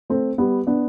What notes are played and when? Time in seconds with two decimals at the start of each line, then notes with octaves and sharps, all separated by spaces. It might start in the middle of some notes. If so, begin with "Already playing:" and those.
0.10 A3 C4
0.38 G3 B3
0.67 B3 D4